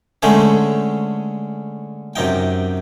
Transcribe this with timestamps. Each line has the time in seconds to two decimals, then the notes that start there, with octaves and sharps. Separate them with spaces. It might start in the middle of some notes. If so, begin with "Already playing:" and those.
0.22 D3 G#3 A3 C#4 C5
2.16 F#2 C3 D#4 G5